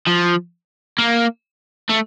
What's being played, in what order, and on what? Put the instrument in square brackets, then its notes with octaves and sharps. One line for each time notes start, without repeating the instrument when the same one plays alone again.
[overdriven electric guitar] F3
A#3
A3